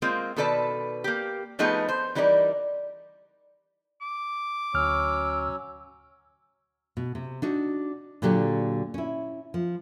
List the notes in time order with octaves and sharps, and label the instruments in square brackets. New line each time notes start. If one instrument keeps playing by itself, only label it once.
[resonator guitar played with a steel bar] G#3 A#3 C4 F4
B2 D#3 A4 B4 D5 A5
A#3 G4
F3 A3 B3 D#4 G#4 B4
C5
E3 G3 D#4 A#4 B4 D5
[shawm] D6
[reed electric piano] D2 F6 [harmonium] F#3 C#4 C#5 [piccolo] E6
[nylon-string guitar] B2
C3
D4 D#4 F#4
A#2 D3 F#3 G4 D5
C#4 E4
F3